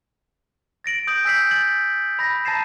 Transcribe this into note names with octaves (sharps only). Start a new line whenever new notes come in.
A6 A#6 D7 F#7
D#6 G6 D7 F#7
G#5 E6 G6 B6 C7 F#7
A6 F#7
B5 A#6
A5 A#5 A6 A#6 C7 E7